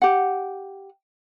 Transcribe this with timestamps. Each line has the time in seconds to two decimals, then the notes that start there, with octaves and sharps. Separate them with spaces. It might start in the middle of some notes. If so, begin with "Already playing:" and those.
0.02 G4 F#5